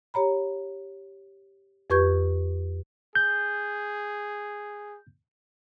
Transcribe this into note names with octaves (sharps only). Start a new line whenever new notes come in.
G4 C#5 A#5 B5
F2 G4 B4 C#6 G6 G#6
G#4 G6